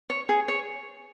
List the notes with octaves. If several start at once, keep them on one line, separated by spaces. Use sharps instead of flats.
C#5
G#4
C#5